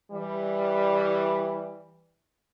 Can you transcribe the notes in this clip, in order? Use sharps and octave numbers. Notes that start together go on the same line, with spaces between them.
E3 G3